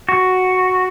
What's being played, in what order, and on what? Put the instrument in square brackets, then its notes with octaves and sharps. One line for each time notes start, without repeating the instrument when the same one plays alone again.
[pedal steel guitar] F#4